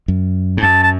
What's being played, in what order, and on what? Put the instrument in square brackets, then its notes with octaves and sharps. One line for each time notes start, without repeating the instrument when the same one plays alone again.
[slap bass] F#2
G#2
[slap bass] F#2 [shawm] A5
[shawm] A5